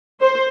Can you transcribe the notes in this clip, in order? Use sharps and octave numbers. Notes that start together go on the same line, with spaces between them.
C5